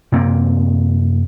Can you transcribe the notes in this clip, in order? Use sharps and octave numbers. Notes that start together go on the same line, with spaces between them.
F#2 C3 A#3 C4